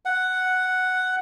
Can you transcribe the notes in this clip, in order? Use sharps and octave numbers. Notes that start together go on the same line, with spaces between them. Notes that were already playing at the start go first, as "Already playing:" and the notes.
F#5